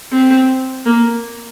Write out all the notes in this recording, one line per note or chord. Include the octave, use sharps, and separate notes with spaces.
C4
A#3